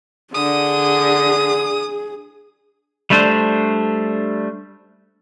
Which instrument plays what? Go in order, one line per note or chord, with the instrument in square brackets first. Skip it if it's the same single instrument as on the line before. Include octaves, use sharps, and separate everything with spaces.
[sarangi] D3 [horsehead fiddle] G#4 [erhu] D#6
[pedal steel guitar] G3 A3 D4 C5